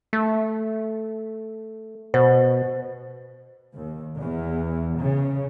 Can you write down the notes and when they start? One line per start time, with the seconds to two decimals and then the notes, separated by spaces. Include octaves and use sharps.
0.13 A3
2.14 B2 C5
3.74 D#2
4.19 E2
5.00 C#3